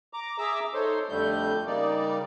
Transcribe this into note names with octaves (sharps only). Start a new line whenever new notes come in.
A#5 D6
G#4 E5 A#5 D6 E6
D#4 A4 C5 C#5 C6
F2 D3 G3 A3 G6
C#3 G3 A#3 D#4 D5